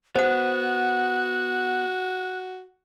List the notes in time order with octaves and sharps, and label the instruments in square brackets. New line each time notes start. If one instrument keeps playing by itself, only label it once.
[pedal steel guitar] B3 [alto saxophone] F#4 [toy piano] C5 F#5 [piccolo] F#6